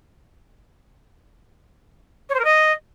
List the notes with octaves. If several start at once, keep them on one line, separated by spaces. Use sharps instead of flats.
C#5
C5
A#4
D#5